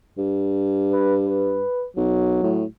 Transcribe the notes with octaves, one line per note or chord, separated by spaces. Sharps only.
G2
B4
B4
B1 F#3
A2